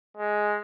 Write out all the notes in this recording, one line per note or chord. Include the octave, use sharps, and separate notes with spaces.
G#3